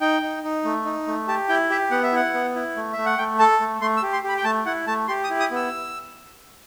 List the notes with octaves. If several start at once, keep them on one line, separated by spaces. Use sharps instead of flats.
D#4 G5
D#4
D#4
A3
D#4
A3
G4 A5
E4 G5
G4 E5
B3 F#5
E5
E4 F#5
B3
E4
A3
A3 E5
F#5
A3 G5
A4 A5
A3
A3 C6
E6
G4
C6
G4 B5
G5
A3 A5
E4 F#5
A3 A5
G4 C6
D#6
E4
D#6
B3 E6